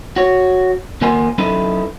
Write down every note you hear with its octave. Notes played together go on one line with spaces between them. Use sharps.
F#4 C#5
D#2 A#3 A#4 F#5 G#5 C6
F#3 C#4 D#4 E4 A4 B4